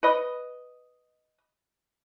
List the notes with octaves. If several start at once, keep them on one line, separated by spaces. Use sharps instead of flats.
B4 D#5